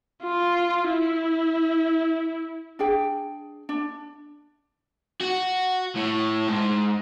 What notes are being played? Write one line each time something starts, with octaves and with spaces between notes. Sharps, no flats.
F4
E4
D4 G#4 G5
D4
F#4
A2
G#2